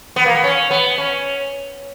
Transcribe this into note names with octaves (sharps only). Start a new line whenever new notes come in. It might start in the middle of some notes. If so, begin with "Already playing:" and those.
B3
A#3
B3
C#4
B3
C#4